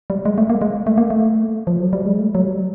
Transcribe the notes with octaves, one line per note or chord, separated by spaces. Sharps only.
G3
G#3
A3
A#3
G#3
A3
A#3
A3
F3
F#3
G3
G#3
A3
F#3
G3